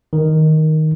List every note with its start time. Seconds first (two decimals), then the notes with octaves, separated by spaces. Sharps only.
0.13 D#3